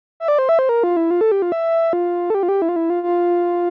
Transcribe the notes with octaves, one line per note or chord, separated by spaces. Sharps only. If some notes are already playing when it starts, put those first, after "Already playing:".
E5
D5
C5
E5
C5
A#4
F4
E4
F4
A4
G4
F4
E5
F4
A4
G4
F4
G4
E4
F4
E4
F4
F4